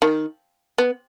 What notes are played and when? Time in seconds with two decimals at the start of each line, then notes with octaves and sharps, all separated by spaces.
0.02 D#3
0.78 B3